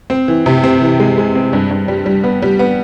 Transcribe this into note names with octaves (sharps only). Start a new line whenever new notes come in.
C4
E3
C3
C4
E3
G#3
G#3
C4
G2
G2
G3
G3
B3
G3
B3